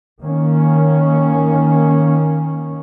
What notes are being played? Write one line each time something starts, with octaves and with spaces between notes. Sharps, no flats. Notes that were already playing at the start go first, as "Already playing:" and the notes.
D#3 A#3 C#4